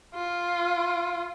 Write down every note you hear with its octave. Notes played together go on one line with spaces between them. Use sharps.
F4